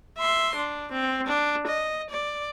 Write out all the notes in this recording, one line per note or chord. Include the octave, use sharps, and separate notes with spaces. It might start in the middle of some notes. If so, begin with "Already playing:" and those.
E5 C6
D4
C4
D4
D#5
D5